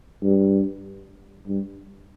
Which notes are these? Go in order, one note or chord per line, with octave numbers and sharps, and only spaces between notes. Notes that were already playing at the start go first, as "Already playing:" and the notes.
G2
G2